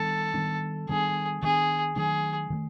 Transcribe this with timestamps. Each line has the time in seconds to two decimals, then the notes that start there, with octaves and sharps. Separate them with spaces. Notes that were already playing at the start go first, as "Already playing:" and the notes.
Already playing: D#3 G3 B3 D4 A4
0.34 D#3 G3 B3 D4
0.89 D#3 G3 B3 D4 G#4
1.42 D#3 G3 B3 D4 G#4
1.96 D#3 F#3 A3 D4 G#4
2.50 D#3 F#3 A3